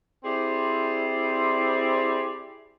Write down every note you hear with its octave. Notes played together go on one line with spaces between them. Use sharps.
C4 E4 G4 G#4 C5 D5